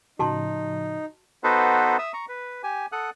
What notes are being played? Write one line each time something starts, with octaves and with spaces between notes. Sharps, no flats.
A2 C#3 F3 D#4 F#4 A5 C6
B3 D#4 F#4 A4 B4 C5
E5 D#6 E6
A#5 C#6
B4
G4 G#5
A4 F#5 D#6 F#6